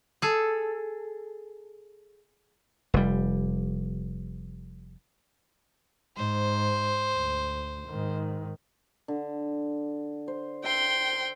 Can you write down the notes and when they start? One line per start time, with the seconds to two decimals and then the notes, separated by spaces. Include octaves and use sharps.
0.22 G#4 A4
2.94 F1 G3
6.17 G#2 C5
7.15 D2
7.88 G#2 D#3
9.08 D3
10.28 C5
10.64 E5 G5 C6